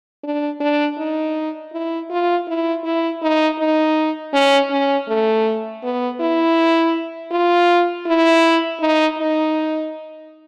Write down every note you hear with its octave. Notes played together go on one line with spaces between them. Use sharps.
D4
D4
D#4
E4
F4
E4
E4
D#4
D#4
C#4
C#4
A3
B3
E4
F4
E4
D#4
D#4